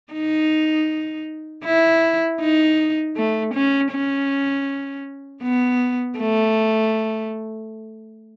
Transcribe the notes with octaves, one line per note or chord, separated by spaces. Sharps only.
D#4
E4
D#4
A3
C#4
C#4
B3
A3